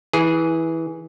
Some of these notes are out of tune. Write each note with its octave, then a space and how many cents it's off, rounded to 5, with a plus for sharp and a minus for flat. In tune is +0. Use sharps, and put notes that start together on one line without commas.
E3 -15 G#4 +0